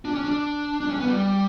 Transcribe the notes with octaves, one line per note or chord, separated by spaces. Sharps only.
D4
C#4
D4
D4
C#4
B3
G3